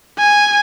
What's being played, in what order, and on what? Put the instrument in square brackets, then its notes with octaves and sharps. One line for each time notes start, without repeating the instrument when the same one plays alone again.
[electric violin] G#5